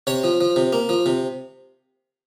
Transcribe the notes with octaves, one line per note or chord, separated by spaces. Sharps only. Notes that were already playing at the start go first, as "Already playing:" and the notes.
C3 C#5
F3
F3
C3
A#3
F3
C3